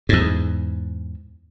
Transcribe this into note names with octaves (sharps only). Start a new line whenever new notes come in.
E2 G#2